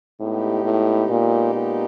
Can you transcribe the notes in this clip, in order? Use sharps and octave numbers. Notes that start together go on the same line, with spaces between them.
A2 G#3 B3 D#4 G4
A2
A#2
A#2